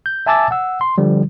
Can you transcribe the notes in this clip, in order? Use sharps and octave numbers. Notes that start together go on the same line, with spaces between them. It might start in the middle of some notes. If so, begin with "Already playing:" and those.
G6
E5 G#5 A5 D6 E6 A6
F#5 E6
C6
D3 F3 G3